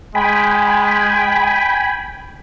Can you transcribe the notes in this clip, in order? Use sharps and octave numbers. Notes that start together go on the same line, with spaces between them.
G#3 G5 G#5 B5